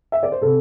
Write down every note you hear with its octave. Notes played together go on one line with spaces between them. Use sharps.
E5
D5
C5
C3 A4